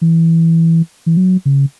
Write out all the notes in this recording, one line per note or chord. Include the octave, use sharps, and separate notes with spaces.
E3
E3
F#3
C#3